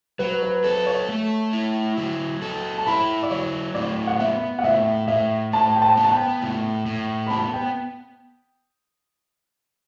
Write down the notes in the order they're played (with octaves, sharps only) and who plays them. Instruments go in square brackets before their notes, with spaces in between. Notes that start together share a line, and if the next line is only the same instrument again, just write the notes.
[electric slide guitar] F#3 [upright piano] B4
[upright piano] B4
[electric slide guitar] A4 [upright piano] B4
[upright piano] C#5
[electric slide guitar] A3
E4
F#3
A4
[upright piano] A5
[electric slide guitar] E4 [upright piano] B5
[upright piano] D5
[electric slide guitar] F#3 [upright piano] C#5
[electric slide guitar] A2 [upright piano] D5
[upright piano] F#5
[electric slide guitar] B3 [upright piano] E5
[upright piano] F#5
[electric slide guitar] A2 [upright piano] E5
[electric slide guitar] A2 [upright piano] E5
[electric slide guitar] A2 [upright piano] A5
[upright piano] G5
A5
[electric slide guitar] B3
[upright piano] A5
G5
[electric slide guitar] A2
A2
[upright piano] B5
[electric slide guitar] B3 [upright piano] A5
[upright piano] G5